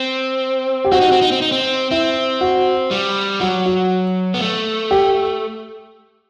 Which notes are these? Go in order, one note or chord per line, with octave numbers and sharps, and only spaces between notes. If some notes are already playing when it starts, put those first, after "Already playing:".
Already playing: C4
G4
C4 F#4
D#4
C4
D#4
C4
D#4
C4
C4 E4
F#4
G3
F#3 F#4
F#4
B3
A3
G4